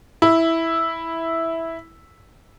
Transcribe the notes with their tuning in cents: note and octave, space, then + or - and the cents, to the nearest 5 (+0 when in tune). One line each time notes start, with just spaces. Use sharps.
E4 -5